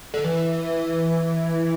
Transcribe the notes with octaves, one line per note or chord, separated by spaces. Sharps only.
D3
E3